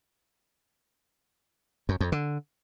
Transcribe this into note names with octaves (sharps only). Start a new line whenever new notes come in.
F#2
F2
D3